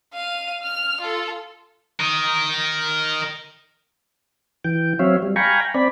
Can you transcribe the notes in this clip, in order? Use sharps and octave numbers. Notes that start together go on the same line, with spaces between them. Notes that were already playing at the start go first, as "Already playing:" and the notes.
F5 D#7
F6
F4 A4
A#4 D#5
E3 G5
F#3 C4 C#5 E5 F5
G3
F5 G5 G#5 A#5 B5 C#6
C4 D5 B5